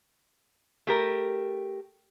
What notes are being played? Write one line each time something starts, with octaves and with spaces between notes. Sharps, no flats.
A3 G4 A#4